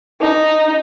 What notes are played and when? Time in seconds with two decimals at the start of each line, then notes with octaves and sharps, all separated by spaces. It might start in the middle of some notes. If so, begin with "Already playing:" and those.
0.22 D#4